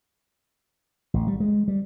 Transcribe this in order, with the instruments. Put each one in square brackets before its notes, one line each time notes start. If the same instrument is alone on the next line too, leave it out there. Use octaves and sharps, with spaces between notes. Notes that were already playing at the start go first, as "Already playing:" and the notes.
[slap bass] A1
G3
G#3
G3